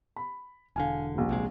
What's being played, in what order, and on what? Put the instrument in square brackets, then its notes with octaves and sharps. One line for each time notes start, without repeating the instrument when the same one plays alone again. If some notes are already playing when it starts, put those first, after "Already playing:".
[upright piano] B5
[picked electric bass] E1 D3 [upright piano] F5 G#5
[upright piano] D#1 A#1
[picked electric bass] B1 C3 G#3